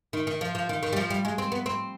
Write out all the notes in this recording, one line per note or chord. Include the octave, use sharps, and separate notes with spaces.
D#3
D#3
F3
F3
D#3
D#3
G3
F3
G3
G#3
C4
B3
C4